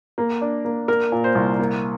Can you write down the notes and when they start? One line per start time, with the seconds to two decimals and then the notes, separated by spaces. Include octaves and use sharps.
0.18 A#3
0.41 D4
0.65 A#3
0.88 A#3 A#4
1.12 A#2
1.24 C5
1.35 C2
1.59 A#3